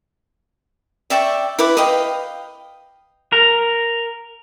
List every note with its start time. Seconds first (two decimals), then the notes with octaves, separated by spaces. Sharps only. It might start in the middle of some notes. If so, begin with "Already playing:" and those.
1.10 D5 E5 G5 C#6
1.59 E4 B4 D6
1.77 B4 D#5 F5 G5
3.32 A#4